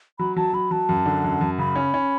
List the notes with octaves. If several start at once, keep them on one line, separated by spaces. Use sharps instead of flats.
F#3 B5
F#3 A5
F#3 B5
F#3 A5
F#2
D3
F#2
F#2
C#3 B5
C#4
C#4